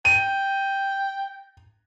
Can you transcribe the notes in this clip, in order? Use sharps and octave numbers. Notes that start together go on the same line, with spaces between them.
G5 D#7